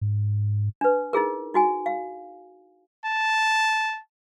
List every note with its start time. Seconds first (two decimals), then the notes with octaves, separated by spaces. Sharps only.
0.01 G#2
0.81 D4 B4
1.13 D#4 E4 G#4 A#4
1.54 D#4 F#4 G#5
1.86 F5
3.06 A5